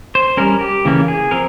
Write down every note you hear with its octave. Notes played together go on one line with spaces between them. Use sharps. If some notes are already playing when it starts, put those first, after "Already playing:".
C5
G3 C#4 A#4
G4
C#3 E3 A#3 C#4
G#4
F3 C4 A#4